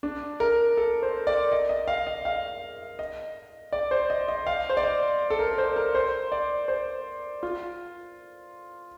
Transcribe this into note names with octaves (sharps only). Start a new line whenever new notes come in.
D4
A#4
A4
C5
D5
D#5
D#5
F5
D#5
F5
D#5
D5
C5
D#5
D#5
F5
C5
D5
D#5
A4
A#4
A#4
C5
A#4
C5
D5
C5
F4